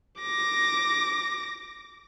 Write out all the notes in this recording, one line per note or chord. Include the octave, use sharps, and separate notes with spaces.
D6 A#6